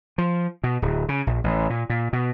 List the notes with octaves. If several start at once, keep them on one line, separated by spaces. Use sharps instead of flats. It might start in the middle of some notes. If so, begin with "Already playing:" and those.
F3
B2
D1
C#3
A#1
A1
A#2
A#2
B2